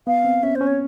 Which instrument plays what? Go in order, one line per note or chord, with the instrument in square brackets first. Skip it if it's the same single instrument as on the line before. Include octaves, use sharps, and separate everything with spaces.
[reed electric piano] B3 [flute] F5
[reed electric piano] C4
[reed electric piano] C#4 [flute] E5
[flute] C5
[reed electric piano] C#4
[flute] C#5